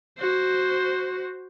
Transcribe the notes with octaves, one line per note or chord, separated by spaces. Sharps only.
F#4 C5